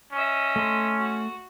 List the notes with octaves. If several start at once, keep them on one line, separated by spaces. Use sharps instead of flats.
C#4 D#5 E5
A3 C6
F#4